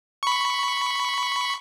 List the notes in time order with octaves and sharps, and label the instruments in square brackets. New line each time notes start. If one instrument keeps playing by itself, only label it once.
[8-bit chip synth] B5 C#6